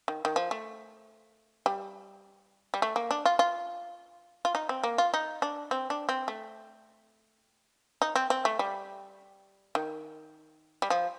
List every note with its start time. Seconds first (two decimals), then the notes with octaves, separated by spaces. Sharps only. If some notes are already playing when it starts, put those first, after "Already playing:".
0.08 D#3
0.25 D#3
0.36 F3
0.51 A3
1.66 G3
2.74 G3
2.82 A3
2.96 A#3
3.11 D4
3.26 F4
3.39 F4
4.45 F4
4.55 D#4
4.69 C4
4.84 A#3
4.98 F4
5.14 D#4
5.42 D4
5.71 C4
5.90 D4
6.09 C4
6.28 A3
8.02 D#4
8.16 C4
8.30 C4
8.45 A3
8.59 G3
9.75 D#3
10.82 G3
10.90 F3